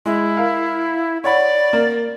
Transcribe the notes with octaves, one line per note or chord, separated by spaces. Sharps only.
G#3 E4
A#4 F5
C#5 D5 F#5 B5
A#3